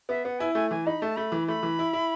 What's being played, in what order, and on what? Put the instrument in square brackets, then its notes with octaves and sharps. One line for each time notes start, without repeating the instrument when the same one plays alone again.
[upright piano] B3 [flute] E5
[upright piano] B3 [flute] F#5
[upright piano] E4 [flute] G#5
[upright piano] A3 [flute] G#5
[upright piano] E3 [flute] G#5
[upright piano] D#4 [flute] B5
[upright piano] A3 [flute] A5
[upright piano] A3 [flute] B5
[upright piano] E3
[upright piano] A3 [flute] B5
[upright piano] E3
E4
E4